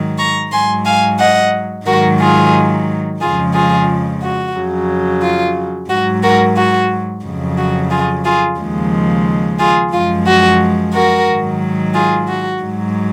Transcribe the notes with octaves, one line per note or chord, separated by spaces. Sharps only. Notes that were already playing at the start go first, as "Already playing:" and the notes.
Already playing: G#2 D#3 F#3
A#5 C#6
G#2 F#3 G#5 C6
F5 G#5
D#5 F#5
G#2 D#3 F#3 F#4 A#4
F4 G#4
F2 C#3 F3 G#3 F4 G#4
F4 G#4
F#4
F2 C#3 F#3
F4
G#2 F#3 F#4
F#4 A#4
F#4
F2 C#3 F#3
F#4
F4 G#4
F4 G#4
D#2 C#3 F3 G#3
F4 G#4
F#2 F3 G#3 F4
F#4
F#4 A#4
G#2 D#3 F#3
F4 G#4
F#4
G#2 F#3